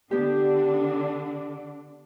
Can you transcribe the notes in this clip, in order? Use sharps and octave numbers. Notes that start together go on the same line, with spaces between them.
D3 B3 D4 G4